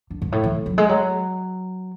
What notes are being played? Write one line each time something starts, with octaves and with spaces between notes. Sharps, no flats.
D3
G#2
A2
E3
F#3
G#3
F#3